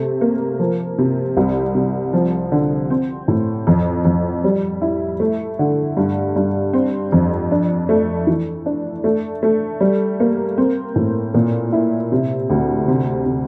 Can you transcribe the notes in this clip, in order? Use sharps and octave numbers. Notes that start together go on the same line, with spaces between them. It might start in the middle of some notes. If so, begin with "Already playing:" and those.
Already playing: C3 A3
A#3
F3
C3
C2
C3
F3
D3
C4
A2
F2
F2
G3
E4
A3
D3
G2
G2
C4
F2
D4
A3
E3
D4
A3
A3
G3
A#3
C4
A2
A#2
E4
C3
D2
C3
C3